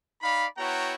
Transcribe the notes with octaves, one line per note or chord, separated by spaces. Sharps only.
D#4 D5 F5 B5
B3 E4 F#4 C#5 G5 A#5